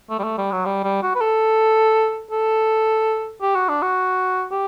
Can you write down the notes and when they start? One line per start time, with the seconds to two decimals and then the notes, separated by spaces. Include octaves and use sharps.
0.10 A3
0.19 G3
0.24 A3
0.38 G3
0.52 F#3
0.66 G3
0.84 G3
1.03 F#4
1.15 B4
1.21 A4
2.31 A4
3.42 G4
3.55 F#4
3.69 D4
3.82 F#4
4.52 G4